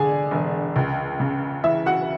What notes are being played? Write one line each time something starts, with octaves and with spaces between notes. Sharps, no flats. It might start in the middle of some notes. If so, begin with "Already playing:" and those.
Already playing: E1 D3 D4 G#4 D5 G#5
E1
C#2
C#3
E3 E4 E5
F#4 F#5